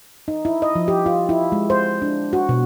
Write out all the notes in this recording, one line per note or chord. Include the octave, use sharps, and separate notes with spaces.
D#4
E4
D#5
F3
G4
F4
E4
G#3
C5
D4
F#4
B2